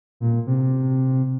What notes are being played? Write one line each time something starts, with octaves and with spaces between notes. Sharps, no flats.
A#2
C3